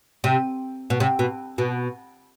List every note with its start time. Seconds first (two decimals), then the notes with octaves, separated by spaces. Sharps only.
0.24 C3
0.90 B2
1.00 C3
1.19 B2
1.58 B2